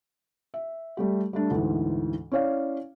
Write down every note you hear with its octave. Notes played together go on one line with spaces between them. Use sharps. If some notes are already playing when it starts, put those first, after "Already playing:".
E5
G3 A3 G4
G3 A3 D4
D2 G#2 E3
C#4 E4 C#5 D5 F5